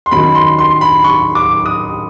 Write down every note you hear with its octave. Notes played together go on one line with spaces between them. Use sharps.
C6
F#2 D#3 F#3 B5
C6
C6
B5
C#6
D6
D#6